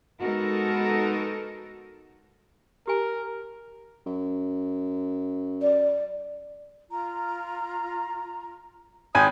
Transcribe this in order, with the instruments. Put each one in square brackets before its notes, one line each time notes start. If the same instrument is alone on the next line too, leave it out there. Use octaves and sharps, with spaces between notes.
[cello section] G#3 B3 D#4 F#4 A4 A#4
[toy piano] G4 G#5 [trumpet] A#4
[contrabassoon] F#2
[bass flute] D5
[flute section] F4 A#5
[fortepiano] G#1 G#5 [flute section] D#6 G6